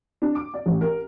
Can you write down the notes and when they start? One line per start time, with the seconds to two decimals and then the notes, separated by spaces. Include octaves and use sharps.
0.22 D4
0.35 D6
0.54 D5
0.66 A1
0.81 A#4